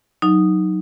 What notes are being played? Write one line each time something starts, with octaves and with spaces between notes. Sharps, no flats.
F#3 D#4